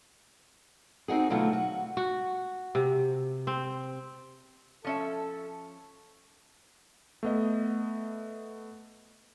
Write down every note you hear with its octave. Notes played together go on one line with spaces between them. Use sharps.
C4 D#4 F#4 G#4
B2 D3 F#3 A3 F4 F#4
F#4
F#4
C3
C4
F3 C#4 A4 E5
A3 B3 D#5